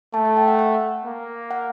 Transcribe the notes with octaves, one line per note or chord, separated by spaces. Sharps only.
A3 A5
A5
G5
F#5
F#5
A#3
F#5